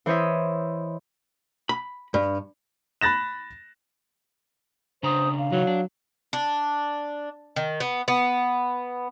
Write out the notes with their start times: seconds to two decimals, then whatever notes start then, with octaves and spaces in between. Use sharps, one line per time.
0.06 E3 C5 C#5 D#5 E5
1.69 B5
2.14 G2
3.01 B5 F#6 A6 A#6 E7
5.03 C#3 D4 C5 A#5 D#6
5.39 F5
5.52 C#3 E3 F#3 D#4
5.67 D4
6.33 D4
7.56 D#3
7.80 B3
8.08 B3